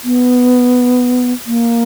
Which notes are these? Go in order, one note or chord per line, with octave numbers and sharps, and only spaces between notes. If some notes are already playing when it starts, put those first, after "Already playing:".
B3
A#3